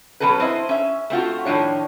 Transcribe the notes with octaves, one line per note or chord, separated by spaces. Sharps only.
B2 F#3 A3 C#4 A4 B4
C4 E4 C5 D#5
C#4 E5
A3 C4 F4 F#4
A2 D#3 F3 D4 C#5